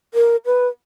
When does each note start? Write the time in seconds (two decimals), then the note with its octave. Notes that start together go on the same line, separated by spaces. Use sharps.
0.14 A#4
0.46 B4